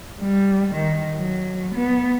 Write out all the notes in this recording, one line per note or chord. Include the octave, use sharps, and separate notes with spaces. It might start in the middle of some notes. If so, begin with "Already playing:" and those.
G3
D#3
F#3
B3